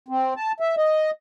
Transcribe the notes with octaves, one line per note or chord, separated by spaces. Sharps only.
C4
A5
E5
D#5